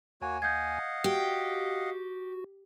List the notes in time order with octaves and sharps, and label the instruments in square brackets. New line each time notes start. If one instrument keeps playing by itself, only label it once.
[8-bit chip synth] D#2 G#5 [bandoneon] A#3 F#4 C#5
[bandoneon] D#5 F5 F#5 [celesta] G6 G#6
[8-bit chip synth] F#4 [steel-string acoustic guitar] G4